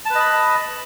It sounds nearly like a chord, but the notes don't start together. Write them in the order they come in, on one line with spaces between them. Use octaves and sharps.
A5 B4 D#5 B5